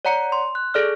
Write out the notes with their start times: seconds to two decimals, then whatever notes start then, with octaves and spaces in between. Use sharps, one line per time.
0.05 C#5 D5 F#5 A#5 C#7
0.32 C6
0.55 F#6
0.74 G#4 A4 D5 F6